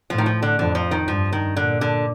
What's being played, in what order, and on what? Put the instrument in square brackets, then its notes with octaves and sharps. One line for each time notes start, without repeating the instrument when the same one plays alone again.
[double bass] A2 [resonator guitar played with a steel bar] F3
[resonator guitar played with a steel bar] D#3
F3
D3
[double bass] F2 [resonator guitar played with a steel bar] D3
[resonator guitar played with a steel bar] F3
D#3
[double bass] G2 [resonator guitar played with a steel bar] F3
[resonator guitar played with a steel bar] D#3
[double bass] A#2 [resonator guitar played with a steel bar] D3
[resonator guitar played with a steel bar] D3